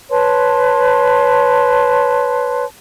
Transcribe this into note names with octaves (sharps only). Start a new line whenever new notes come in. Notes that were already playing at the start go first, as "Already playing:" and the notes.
B4 C#5 A5 C6